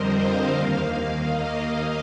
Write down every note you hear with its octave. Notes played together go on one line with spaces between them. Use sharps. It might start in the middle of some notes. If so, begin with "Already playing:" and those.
Already playing: F2 D3 G3 C4 A#4 C5 D#5
F5
D#2 D#3 A#3 F5
D#5